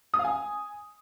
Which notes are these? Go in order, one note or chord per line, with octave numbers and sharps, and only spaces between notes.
D#6
F5
G#5